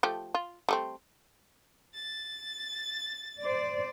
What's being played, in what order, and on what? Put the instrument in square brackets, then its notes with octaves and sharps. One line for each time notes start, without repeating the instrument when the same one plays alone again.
[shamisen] F3 A3 G4
F4
G3 A3 C4
[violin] A6
[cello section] C5 D5